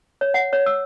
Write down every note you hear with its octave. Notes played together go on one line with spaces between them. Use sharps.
C#5
F#5
C#5
E6